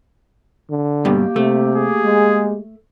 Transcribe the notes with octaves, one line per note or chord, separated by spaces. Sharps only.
D3
G2 B2 A#3 G4
C3 A3
G#4
G#3